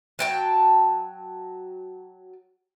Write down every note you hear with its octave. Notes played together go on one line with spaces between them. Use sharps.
F#3 G5 A5